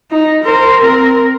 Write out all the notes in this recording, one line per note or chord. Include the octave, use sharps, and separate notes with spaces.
D#4
A#4 C5
C4 A#4